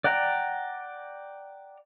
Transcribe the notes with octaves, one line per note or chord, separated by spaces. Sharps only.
D5 F#5 G5 A#5